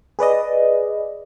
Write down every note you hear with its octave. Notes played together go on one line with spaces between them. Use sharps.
G#4 B4 D5 D#5